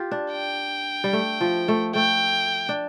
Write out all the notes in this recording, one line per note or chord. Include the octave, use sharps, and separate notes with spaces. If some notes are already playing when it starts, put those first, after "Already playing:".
Already playing: F4 G4
D4
G5
G3
A3
F3
A3
A3 G5
D4